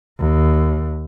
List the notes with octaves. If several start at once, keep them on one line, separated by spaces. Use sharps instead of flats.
D#2